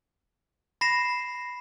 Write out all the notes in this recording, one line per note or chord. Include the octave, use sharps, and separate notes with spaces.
B5 A#6 C7 E7